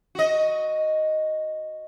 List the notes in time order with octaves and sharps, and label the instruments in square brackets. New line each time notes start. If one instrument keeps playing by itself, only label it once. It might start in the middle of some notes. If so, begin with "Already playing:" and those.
[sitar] F#4 D#5